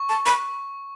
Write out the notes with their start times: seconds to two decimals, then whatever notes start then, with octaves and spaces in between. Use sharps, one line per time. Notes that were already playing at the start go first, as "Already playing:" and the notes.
Already playing: C#6
0.09 A5
0.26 B5